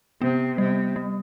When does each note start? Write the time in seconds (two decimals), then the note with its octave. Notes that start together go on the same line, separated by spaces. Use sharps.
0.22 C3 B3
0.58 C3 G3
0.96 G3